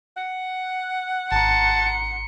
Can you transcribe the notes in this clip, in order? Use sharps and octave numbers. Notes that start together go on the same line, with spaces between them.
F#5
G#1 A5 A#5 C6 C#7